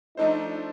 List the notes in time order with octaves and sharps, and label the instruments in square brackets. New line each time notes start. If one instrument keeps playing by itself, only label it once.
[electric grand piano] F3 A3 D4 A4 C5 [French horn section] D#4